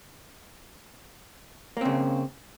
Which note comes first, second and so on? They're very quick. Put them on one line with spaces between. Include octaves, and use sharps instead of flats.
A#3 C4 C#3